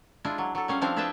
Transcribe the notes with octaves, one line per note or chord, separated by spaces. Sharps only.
G#3 D4 E4 F4
F#3
F#3 A4
G3 C#4 F5
F3 C4 D4 E4 F5
D4 G#4 B4 E5 G5 A5